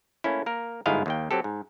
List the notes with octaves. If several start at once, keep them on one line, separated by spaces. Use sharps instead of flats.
A3 A#3 C#4 E4
A#3 A#4
G1 G#2 B3 E4 D#5 F5
D#2 A#3 G5
F#3 C4 G4 A4
G#2